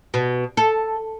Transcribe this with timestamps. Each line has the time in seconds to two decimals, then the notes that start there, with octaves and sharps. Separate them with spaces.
0.14 B2
0.57 A4